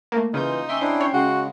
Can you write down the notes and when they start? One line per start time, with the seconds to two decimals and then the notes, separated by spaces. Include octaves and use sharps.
0.12 A3 A#3
0.34 C#3 E3 D#4 F4 G6
0.69 C#4 E5 G5 C6
0.81 D4 E4 C5
1.01 C#5
1.13 C#3 G#3 F#4